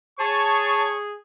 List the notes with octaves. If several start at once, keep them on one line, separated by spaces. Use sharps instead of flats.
G#4 C#5 A5 C#6